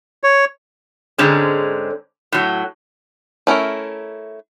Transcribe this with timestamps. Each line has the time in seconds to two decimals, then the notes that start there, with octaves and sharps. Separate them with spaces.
0.24 C#5
1.18 G#2 D3 G#3 C4 C#4
2.32 A2 F#3
3.47 A3 C#4 E4 A#4